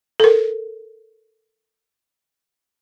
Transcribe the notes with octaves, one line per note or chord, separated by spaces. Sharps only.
A4 A#4